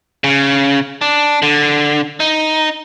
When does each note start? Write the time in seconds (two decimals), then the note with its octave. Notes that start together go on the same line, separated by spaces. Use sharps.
0.24 C#3
1.01 D4
1.42 D3
2.20 D#4